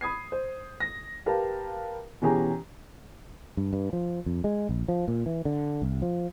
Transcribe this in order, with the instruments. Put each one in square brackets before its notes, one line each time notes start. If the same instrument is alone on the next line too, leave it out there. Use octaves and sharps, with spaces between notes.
[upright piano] B5 D#6 G#6 C7
C5
A#6
G4 A#4 B4 F5 A5
B2 E3 C#4 G4 G#4 A#5
[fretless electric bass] G2
G2
F3
F2
G#3
A#1
F3
A#2
E3
D3
C2
F3